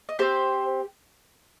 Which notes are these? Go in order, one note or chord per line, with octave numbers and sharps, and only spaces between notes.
D#5
C4 G4 C5